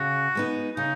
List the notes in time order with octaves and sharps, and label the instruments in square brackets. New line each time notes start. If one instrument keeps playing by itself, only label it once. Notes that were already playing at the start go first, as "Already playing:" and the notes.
Already playing: [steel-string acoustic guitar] C#3 [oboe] F#4
[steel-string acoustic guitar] G#3 B3 D#4
[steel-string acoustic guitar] C#3 [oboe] D#4